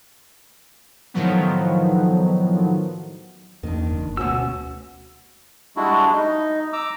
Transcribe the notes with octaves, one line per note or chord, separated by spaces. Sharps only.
A2 D#3 F3 F#3 B3
E2 D#3 A#3 D4
F#1
D2 B2 A3 C#4 F#4 E6
G3 G#3 D4 E4 F#4
D#4 D#5
A#5 D6 E6